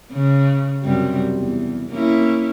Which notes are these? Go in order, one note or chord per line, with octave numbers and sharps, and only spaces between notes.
C#3
F#2 C3 G3
E2
A#3 C#4 E4